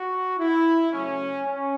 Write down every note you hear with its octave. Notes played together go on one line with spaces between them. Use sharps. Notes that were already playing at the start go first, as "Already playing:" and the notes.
Already playing: F#4
E4
C#3 F#3 A3 C#4
C#4